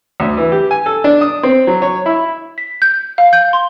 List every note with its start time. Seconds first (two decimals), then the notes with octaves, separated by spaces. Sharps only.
0.20 D2
0.37 E3
0.52 G4
0.71 G#5
0.86 A4
1.04 D4
1.21 D#6
1.43 C4
1.67 F#3
1.82 C#5
2.06 E4
2.58 B6
2.82 G6
3.18 F5
3.33 G6
3.53 C6